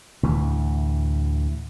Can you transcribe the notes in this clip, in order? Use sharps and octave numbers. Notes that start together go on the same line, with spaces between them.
D2 A2 E3